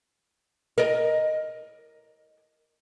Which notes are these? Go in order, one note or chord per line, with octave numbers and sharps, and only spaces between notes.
A#4 D#5